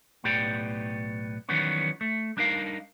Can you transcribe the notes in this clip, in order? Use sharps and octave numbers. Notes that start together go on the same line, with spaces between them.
B1 A2 B3 G4 D5 G5
D#3 E3 F#3 G3 B3 C#4
A3
G3 D4 D#4 A#4 F5